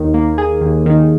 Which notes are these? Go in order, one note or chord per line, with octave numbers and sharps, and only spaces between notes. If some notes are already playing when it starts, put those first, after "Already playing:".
Already playing: D#2 D#3
A#3
G#4
D#2
D#3